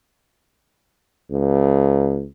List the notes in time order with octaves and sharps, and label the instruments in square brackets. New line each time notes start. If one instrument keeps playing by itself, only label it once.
[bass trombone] C#2